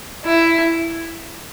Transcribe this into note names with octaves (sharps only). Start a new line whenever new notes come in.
E4